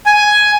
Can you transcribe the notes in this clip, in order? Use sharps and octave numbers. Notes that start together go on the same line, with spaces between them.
G#5